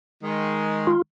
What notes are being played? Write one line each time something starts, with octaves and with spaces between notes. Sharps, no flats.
D#3 G#3
F4